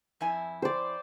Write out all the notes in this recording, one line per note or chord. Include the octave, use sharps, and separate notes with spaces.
F2 E4 G#5
C5 D5